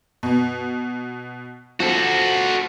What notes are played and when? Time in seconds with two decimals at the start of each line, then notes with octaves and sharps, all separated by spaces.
0.23 B2
1.80 F3 F#4 A4